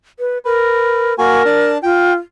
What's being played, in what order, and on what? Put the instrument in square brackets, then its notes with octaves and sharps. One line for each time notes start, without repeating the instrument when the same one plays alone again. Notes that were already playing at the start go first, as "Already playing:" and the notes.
[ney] B4
[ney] A#4 [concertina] B4
[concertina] A#3 F#4 G#5 [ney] A#4
[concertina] D4 A5
[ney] F4 [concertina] G5